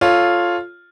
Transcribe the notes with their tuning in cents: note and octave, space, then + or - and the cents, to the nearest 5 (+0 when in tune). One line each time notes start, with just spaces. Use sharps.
F4 +0 A4 +0 C#5 +0